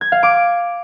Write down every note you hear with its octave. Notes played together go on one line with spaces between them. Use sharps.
G#6
F5
D6